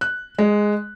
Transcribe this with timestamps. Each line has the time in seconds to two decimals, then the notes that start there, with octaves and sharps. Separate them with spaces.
0.01 F#6
0.38 G#3